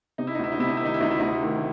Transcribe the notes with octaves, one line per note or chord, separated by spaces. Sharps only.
C3 D#4
E4
D#4
D2 E4
D#4
C3 E4
D#4
D#3 E4
D#4
E4
D2 D#4
E4
D2 D#4
D#3